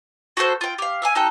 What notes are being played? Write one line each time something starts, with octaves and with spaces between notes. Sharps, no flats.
F#4 G4 A4 C5
F4 G5
G4 F5
E5 F5 G#5
D#4 F#4 A4 G5